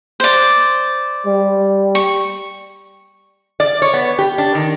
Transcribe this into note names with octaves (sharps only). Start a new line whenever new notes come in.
C5 D5
G3
C#6
D5
C#5
B3
G4
D4
D#3